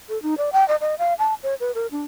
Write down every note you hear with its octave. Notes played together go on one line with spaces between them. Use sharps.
A4
D#4
D5
G5
D#5
D#5
F5
A5
C#5
B4
A#4
D4